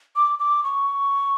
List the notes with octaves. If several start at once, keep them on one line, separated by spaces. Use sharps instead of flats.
D6
D6
C#6